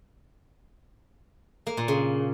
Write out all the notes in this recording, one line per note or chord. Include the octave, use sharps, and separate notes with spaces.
A#3
A#2
C#3